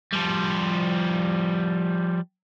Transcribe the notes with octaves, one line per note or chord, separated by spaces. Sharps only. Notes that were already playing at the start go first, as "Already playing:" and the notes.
F3 G3